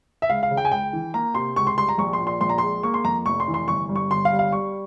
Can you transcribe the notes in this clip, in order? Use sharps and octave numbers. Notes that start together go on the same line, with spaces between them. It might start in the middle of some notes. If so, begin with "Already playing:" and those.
E5
C#2 F5
F5
C#3
G5
G#5
C#2 G5
E3
A#3 A#5
C3 C6
C#2 C#6
C6
G3 C6
A#5
A#1 C#6
C6
A#2
C6
A#1 C6
A#5
G#3 C6
A#3 C#6
C6
F2 A#5
F1 C#6
C6
E3
C6
G1 C#6
G2
C#6
G1 C6
F5
G3
F5
G3 C#6